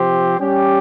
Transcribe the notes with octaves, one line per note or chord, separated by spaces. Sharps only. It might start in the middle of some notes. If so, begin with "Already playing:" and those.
Already playing: C3 F3 C4 G4 C5
G3 C#4 G4